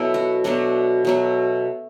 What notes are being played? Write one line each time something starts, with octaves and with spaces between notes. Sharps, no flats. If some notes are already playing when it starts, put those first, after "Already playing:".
Already playing: B2 F#3 A3 E4
F#4
B2 F#3 A3 D4
B2 F#3 A3